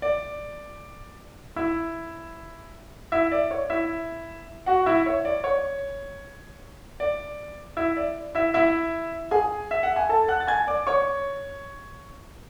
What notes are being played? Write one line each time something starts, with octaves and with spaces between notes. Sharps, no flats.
D5
E4 E5
E4 E5
D5
C#5
E4 E5
F#4 F#5
E4 E5
C#5
D5
C#5
D5
E4 E5
D5
E4 E5
E4 E5
G#4 G#5
E5
F#5
G#5
A4 A5
F#5 F#6
A6
G#5 G#6
D5 D6
C#5 C#6